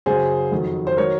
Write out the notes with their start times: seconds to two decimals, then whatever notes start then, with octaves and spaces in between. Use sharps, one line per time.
0.06 F#2 C#3 F#3 G#4 C5
0.52 F2 D#3 F#3
0.87 C5
0.97 D#3 F#3 A#4 C#5